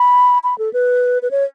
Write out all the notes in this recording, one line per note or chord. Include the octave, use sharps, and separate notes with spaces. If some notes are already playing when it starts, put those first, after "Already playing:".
Already playing: B5
B5
A4
B4
B4
C#5